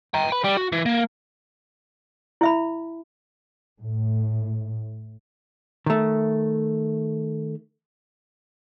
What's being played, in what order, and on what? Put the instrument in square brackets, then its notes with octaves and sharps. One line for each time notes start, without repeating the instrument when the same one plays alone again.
[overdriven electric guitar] G5 A#5
B4 B5
G3
F#4
E3
A#3
[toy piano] E4 E5 B5
[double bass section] A2
[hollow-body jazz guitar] D#3 A3